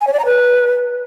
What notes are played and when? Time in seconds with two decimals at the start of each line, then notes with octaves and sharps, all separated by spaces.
0.01 G#5
0.07 C#5
0.13 D5
0.19 A#5
0.25 B4